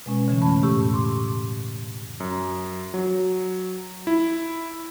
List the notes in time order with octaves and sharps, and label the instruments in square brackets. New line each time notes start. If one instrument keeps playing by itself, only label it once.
[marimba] B2 G#3 C#4 B4
C#3 E3 A3 C#4
F2 A3 C#4 A5 B5
A2 G4 C#6 E6
C6 D6
[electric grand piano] F#2
F#3
E4